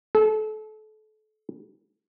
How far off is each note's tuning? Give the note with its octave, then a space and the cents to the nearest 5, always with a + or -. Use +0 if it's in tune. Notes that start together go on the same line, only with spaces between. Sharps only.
A4 -30